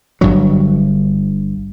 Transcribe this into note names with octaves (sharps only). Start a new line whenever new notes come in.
G1 G2 D3 F#3